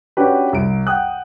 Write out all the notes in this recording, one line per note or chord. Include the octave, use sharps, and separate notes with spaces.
C#4 D4 F#4 G4 B4
C2 D7
F#5 G5 D#6 F#6